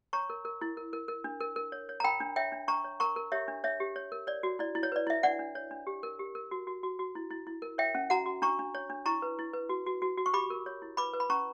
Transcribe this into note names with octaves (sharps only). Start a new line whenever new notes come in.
C#5 A#5 C#6
A#4
A#4
E4
A#4
A#4
A#4
D4
A#4
A#4
C#5
C#5
A#5
A#4 G5 B5
D4
C#5 E5 G5
D4
D4 A#5 C#6
C#5
A#4 A#5 C#6
A#4
G4 C#5 E5
D4
C#5 E5
G4
C#5
A#4
C#5 D5
F#4
E4 D5
E4
C#5
B4 D5
E4 E5
D4 D5 F#5
D4
C#5
D4
G4
A#4
G4
A#4
F#4
F#4
F#4
F#4
E4
E4
E4
A#4
C#5 E5 G5
C#4
F#4 F#5 A#5
F#4
D4 A#5 C#6
D4
C#5
D4
E4 A#5 C#6
B4
E4
B4
F#4
F#4
F#4
F#4
C#6
G4 B5 D6
A#4
C#5
E4
B4 B5 D6
B4
B5
C#4 A#5 C#6